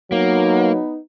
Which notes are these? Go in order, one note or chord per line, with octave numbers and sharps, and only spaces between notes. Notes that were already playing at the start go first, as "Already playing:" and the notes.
F#3 A#3 B3 D#4